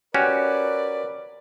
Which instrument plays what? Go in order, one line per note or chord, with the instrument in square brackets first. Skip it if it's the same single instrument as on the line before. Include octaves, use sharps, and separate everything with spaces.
[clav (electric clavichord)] C#4 F#4 G4 [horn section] A#4 B4 D5